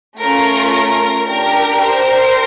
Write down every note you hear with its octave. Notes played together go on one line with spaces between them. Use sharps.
A3 C#4 F4 A#4
A#4
D4 G4 A#4
A#4 C5